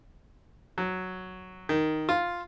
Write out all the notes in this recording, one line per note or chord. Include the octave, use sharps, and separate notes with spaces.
F#3
D#3
F4